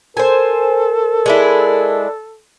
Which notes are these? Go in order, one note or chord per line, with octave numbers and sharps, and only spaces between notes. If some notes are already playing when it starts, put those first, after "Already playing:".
A4 A#4 C5 G#5
G#3 D4 E4